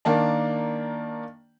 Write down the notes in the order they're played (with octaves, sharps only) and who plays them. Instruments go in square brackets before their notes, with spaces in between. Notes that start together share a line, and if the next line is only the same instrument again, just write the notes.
[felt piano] D#3 A#3 D4 A5